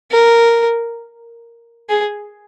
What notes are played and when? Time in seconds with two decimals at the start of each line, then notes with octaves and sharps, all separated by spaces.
0.11 A#4
1.89 G#4